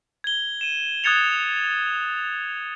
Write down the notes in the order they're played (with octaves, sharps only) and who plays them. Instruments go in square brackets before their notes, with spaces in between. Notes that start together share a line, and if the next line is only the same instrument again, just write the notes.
[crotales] G#6 G7
D#7 E7
D#6 F#6 G#6 A6 C#7 F7